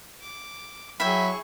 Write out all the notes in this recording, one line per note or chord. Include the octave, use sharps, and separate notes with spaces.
D6
F#3 E4 G#4 E5 G5 B5 C#6